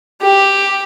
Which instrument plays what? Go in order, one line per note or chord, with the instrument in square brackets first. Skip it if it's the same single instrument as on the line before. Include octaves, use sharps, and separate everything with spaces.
[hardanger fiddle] G4